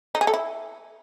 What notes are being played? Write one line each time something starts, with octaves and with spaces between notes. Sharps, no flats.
D#4
G#4
A4
E4